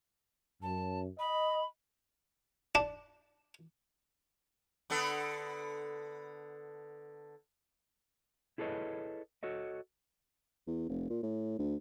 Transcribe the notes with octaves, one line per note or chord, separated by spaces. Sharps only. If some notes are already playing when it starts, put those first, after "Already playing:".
F#2 A5
D#5 B5
D4
D3 B3 A4
E4 G#4 A4 B4 C#5 D#5
F#4 A4 C#5 D#5
E2
F1
A#2
A2
D2